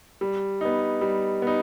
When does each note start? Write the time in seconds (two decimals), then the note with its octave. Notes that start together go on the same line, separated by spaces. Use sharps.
0.21 G3
0.61 B3 D#4
1.01 G3
1.42 B3 D#4